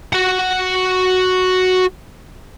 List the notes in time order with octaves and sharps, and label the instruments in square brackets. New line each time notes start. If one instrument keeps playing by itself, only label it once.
[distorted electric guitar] F#4 F#5